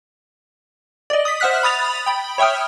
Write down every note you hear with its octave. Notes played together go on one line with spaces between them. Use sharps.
D5 D#5
D#6 B6
C5 E5 F#5 F6 F#6 B6
B5 D#6 A6 F7
G5 B5
C#5 E5 G5 D#6 F6